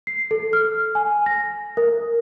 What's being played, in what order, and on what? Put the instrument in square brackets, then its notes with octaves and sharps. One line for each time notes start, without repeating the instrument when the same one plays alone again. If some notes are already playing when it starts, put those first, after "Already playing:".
[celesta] C7
A4
F6
G#5
A#6
A#4